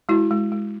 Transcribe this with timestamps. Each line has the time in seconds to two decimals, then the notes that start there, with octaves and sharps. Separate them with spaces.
0.09 G#3 E4 F#4
0.31 G#3
0.52 G#3